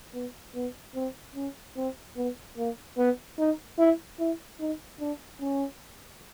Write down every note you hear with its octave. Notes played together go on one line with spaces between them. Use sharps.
B3
B3
C4
C#4
C4
B3
A#3
B3
D#4
E4
E4
D#4
D4
C#4